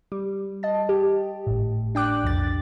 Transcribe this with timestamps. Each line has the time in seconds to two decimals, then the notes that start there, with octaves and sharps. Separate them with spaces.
0.12 G3
0.63 D#5 A5
0.89 G4
1.47 G#1 A2
1.95 D4 G5 D6 F#6
2.23 B1 F2 A6